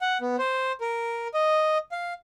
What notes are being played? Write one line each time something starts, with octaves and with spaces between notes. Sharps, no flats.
F#5
B3
C5
A#4
D#5
F5